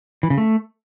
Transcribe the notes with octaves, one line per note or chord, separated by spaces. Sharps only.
E3
C#3
A3